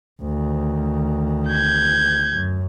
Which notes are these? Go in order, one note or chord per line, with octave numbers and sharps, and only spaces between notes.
D2 D#3
G6 G#6
F#2